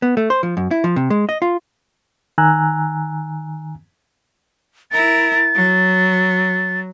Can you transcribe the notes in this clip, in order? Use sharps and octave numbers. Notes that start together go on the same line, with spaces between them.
B3
A3
C5
F3
F#2
E4
F3
C3
G#3
D#5
F4
D#3 G#5 A#5 E6 F#6
E4 A#4 A6
F#3